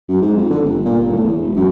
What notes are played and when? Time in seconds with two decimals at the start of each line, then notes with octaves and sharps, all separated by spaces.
0.08 F#2
0.21 G#2
0.37 F2
0.50 D3
0.64 G1
0.85 A#2
0.99 G1
1.12 A2
1.24 E2
1.41 E1
1.56 F#2